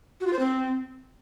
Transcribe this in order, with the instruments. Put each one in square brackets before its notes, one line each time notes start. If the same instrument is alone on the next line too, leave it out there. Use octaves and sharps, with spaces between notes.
[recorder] F#4
F4
C5
C4